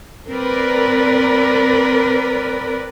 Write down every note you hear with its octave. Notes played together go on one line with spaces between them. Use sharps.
C4 A#4 B4 D5